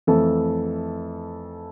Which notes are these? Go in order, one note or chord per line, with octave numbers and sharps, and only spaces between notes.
F2 E3 A3 A4